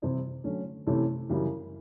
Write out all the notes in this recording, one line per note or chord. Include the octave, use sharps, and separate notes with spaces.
C3 E3 G3 C4 E4
D3 F#3 A3 C#4
C3 E3 A3 C#4 E4
F#2 C#3 E3 G3